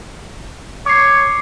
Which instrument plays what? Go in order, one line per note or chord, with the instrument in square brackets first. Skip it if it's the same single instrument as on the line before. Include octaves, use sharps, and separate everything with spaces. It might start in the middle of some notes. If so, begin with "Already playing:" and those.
[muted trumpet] C#5 [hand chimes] D6 C7